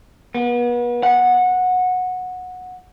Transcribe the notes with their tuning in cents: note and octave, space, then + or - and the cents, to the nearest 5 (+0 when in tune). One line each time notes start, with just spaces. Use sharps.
B3 -35
F#5 -15